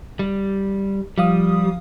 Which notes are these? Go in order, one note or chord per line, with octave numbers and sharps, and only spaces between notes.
G3
F3 G3 F5 D#6